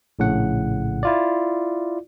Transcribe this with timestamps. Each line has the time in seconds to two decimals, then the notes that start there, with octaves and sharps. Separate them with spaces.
0.19 A#1 A2 C#3 F#5
1.03 E4 F4 D5